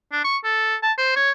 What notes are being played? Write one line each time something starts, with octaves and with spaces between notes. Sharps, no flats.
D4
C#6
A4
A5
C5
C#5